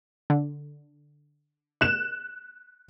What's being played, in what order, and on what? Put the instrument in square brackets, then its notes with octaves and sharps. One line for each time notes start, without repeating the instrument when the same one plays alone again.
[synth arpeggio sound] D3
[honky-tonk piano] F#6 E7